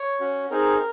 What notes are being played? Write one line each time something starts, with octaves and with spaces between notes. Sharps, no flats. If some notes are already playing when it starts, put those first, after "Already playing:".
Already playing: C#5
C#4 F#4
C4 D#4 G#4 A#4